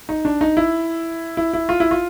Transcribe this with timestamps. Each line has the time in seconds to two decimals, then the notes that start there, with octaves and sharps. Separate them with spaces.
0.09 D#4
0.25 D4
0.41 D#4
0.57 E4
1.37 E4
1.53 E4
1.69 F4
1.80 E4
1.91 F4